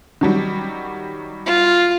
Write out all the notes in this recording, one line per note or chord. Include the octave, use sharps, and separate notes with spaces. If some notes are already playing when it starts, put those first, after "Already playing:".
D#3 F#3 G3
F4